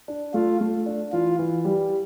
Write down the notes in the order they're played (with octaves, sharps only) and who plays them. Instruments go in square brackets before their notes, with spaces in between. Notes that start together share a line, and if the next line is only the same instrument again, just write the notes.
[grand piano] D4
[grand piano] A3 [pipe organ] F4
[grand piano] A3
D4
[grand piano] E3 [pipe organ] F4
[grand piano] E3
G3